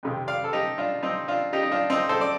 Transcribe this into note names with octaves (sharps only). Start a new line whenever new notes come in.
F2 C3 D#3
D5 F5
A4
D#4 G4
D4 F4
C4 D#4
D4 F4
D#4 G4
D#4
D4 F4
C4 D#4
A4 C5
D5